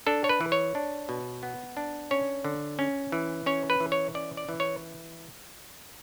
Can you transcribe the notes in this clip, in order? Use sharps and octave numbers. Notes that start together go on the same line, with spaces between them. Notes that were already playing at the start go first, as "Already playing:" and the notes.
D4 A4
C#5
B4
E3
C#5
D4
B2
B3
D4
C#4 C#5
D3
C#4
E3
C#4 C#5
B4
E3
C#5
C#4 D5
D5
E3
C#5